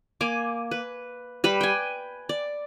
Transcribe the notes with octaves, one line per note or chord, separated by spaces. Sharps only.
A#3 G#5 D6
B4
G3 B4 B5
G5 G#5
D5